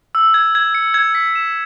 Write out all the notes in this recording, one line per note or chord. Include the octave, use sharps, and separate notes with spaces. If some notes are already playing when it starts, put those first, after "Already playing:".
E6
G#6
G#6
C#7
G#6
B6
E7